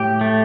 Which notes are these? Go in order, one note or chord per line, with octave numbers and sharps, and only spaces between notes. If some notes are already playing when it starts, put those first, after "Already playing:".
Already playing: A2 G4
A3